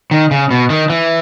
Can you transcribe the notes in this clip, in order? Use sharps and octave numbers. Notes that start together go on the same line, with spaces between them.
D#3
C#3
B2
D#3
E3